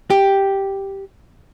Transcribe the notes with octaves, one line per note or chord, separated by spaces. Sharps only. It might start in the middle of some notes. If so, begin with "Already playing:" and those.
G4